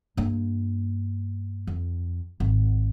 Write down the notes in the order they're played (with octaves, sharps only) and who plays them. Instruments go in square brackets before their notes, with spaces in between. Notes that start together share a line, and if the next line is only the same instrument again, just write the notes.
[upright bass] G2 A#3
F2
G#1